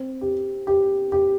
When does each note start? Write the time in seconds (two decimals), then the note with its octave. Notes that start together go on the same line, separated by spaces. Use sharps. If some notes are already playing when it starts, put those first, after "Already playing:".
Already playing: C4
0.21 G4
0.67 G4
1.12 G4